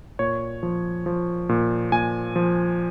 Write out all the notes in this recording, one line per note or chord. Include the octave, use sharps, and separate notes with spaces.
A#2 C#5
F3
F3
A#2
A#2 G#5
F3